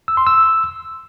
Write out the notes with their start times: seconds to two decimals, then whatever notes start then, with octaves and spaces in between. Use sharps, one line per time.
0.08 E6
0.17 C6
0.27 E6